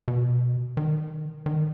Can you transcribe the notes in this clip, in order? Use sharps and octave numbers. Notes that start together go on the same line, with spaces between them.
B2
D#3
D#3